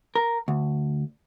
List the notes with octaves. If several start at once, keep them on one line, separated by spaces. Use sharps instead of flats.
A#4
D2